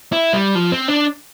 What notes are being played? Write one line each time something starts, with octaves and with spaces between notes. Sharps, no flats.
E4
G3
F3
C4
D4